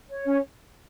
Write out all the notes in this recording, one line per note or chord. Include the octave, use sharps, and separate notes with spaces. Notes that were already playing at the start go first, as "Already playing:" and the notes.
C#5
C#4